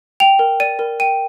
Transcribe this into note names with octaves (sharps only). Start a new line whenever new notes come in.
G5 F7
A#4
D5 D#7
A#4
G5 D#7